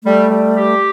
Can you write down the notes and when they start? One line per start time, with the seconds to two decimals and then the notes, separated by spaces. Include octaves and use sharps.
0.04 G3 A3
0.30 G3
0.56 G4